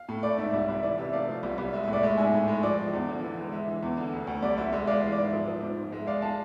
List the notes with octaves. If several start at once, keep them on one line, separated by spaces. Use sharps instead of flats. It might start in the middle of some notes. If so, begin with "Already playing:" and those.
Already playing: F5
A2
A3 D5
G#2 E5
C2 E5
C2 E5
E5
E3 D5
C3 E5
A3 D5 F5
F3
C2
C2
G#3 E5
E5
A2
D5
G#3 E5
G#2 E5 G#5
A2
G#3
F3 D5
F3
E2
D3
E3
G#3
G#3 E5
E3
E2
D3
D2
D2
C2 D5
C2 E5
G#3 E5
G#3 D5 F5
E3
D5
G#2 E5
F3
F3
G#2
G#2
G#3 E5
G#3 D5 F5
G#3 F5 A5